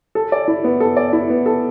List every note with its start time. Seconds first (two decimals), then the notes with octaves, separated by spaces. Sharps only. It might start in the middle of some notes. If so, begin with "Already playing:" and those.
0.15 A4
0.32 D5
0.48 E4
0.64 B3
0.80 A4
0.97 D5
1.13 E4
1.30 B3
1.46 A4